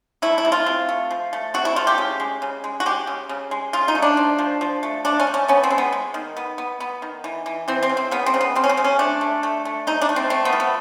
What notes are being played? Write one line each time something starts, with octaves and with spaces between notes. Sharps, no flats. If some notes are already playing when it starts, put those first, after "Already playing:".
A3 E4
E4
C3
F4
C3
A3
F3
A3
C3 F#4
E4
A3 F4
G4
C#3
G#3
C#3
G#3
F#4
G#3 G4
C#3
C#3
G#3
C#3 F4
D#4
A3
D4
F3
F3
F3
A3
A3 D4
C#4
A3
C#4
B3 C#4
C4
G#3
B3
G#3
D#3
B3
B3
B3
D#3
E3
E3
E3 C4
C4
C#3
C4
C#3 B3
C4
C#3
B3
C#3 C4
C#4
C4
C#3
C#4
A3 D4
A3
A3
A3
C3 D#4
D4
A3
C4
A3 C4
B3
F3
B3